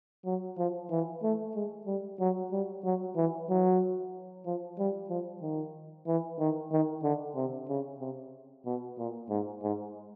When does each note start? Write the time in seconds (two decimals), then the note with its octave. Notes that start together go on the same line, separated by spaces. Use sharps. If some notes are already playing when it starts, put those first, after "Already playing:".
0.25 F#3
0.58 F3
0.90 E3
1.23 A3
1.55 G#3
1.87 G3
2.20 F#3
2.52 G3
2.84 F#3
3.16 E3
3.49 F#3
4.46 F3
4.78 G3
5.09 F3
5.42 D#3
6.07 E3
6.39 D#3
6.72 D#3
7.03 D3
7.35 C3
7.69 C#3
8.00 C3
8.65 B2
8.98 A#2
9.29 G#2
9.62 G#2